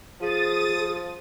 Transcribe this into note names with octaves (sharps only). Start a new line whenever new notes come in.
F3 G#4 D#6 A6 D#7